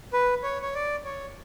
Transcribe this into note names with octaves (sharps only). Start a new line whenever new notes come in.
B4
C#5
C#5
D5
C#5